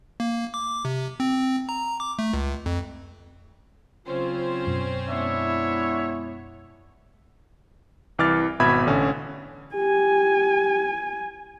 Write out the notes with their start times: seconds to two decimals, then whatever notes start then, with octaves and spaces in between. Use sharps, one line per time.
0.20 A#3
0.54 D6
0.85 C3
1.20 C4
1.69 A#5
2.00 D6
2.19 A3
2.33 C#2
2.66 F2
4.06 C#3 F#3 C4 C#4 F4 C5
4.67 F#2 B2
5.09 G#3 B3 D4 E4 C#5 E5
8.19 C2 E3 D6 F6 A6
8.60 G#1 B2 E5 B5 G#6
8.86 A1 D3 C#4
9.75 G4 G#5